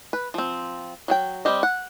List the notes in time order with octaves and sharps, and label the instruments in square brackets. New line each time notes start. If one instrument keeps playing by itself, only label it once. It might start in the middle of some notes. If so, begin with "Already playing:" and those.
[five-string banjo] B4
F3 C4
F#3 G#4 G5
G3 C4 G4 D#5
F#5